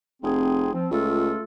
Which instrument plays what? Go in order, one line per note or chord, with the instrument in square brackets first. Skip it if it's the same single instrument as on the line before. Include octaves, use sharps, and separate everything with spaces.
[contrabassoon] F1 [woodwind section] C4 G#4
[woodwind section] F3 C4
[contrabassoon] C#2 [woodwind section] A3 F4 A4